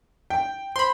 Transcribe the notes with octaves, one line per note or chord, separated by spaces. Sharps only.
G5
C5 B5 C6